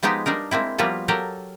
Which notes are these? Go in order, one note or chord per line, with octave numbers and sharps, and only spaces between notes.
F3 G#3 B3 D#4 G4 A5
G3 D4 D#4 A#4
G#3 A#3 C4 E4
F3 G3 A#3 B3 F4 F#4
F#3 G4 A4 A#4